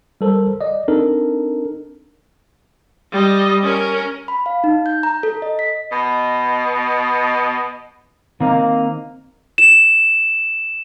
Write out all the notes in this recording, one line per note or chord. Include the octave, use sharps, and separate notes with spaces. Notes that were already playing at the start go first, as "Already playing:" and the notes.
G3 A4 A#4 C5
D5 D#5
C4 D4 D#4 A4 A#4
G3 D#5
C#4 A#4
B5
F5
D#4
G6
A#5
A4
D#5
B6
B2 D#5
D#3 A#3 C4 D#4
E7